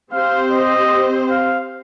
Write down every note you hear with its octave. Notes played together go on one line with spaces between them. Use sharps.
C4 G4 C5 F5
D#5
F5